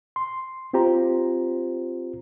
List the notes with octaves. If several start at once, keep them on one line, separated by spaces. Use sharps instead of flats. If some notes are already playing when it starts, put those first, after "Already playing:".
C6
C4 F4 G4 C5 A#5